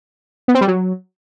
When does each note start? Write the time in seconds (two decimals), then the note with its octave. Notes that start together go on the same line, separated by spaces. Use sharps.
0.48 B3
0.55 C4
0.61 G3
0.68 F#3